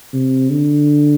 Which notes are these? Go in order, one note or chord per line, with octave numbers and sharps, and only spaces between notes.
C3
D3